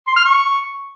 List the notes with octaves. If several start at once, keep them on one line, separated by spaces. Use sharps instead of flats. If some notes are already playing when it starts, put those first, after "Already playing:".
C6
F6
C#6